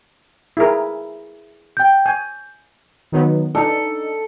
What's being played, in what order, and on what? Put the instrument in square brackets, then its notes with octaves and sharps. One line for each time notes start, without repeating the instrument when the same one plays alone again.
[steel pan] E4 G#4 A#4
[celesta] G5 G6
[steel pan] G#5 [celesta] G6
[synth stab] D#3 F#3 B3
[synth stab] D4 D#4 [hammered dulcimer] A4